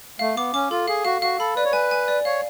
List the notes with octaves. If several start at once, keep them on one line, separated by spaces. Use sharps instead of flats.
A3 F5
B3 D6
C#4 D6
F4 A4
G#4 F5
F#4 F5
F#4 F5
A4 B5
B4 D5
C#5
B4 G#5
G#5
D5
C#5 F5